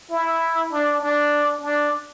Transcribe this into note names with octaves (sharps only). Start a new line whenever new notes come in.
E4
D4
D4
D4